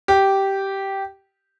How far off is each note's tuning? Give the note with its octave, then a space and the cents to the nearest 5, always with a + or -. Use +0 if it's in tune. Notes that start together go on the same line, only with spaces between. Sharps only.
G4 -10